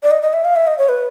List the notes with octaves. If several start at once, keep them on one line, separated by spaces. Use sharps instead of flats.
D5
D#5
D#5
E5
F5
E5
D#5
C#5
B4